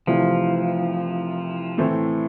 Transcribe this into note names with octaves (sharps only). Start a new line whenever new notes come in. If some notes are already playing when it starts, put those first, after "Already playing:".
C2 C3 E3 F3 A3
A2 E3 A3 C4